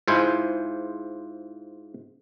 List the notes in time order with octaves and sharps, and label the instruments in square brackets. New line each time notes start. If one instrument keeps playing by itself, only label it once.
[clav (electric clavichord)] G#2 E4 F4 C5 G#5